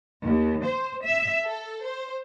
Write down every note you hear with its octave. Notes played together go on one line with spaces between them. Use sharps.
D#2
C5
E5
A4
C5